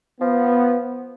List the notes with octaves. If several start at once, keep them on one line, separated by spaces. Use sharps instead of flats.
F3 B3